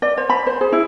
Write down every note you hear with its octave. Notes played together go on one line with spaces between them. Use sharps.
D5
C5
B5
C5
G#4
E4